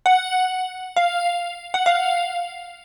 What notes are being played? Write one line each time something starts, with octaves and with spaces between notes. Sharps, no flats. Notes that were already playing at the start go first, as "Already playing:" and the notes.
F#5
F5
F#5
F5